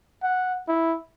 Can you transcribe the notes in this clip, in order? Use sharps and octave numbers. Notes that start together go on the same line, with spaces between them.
F#5
E4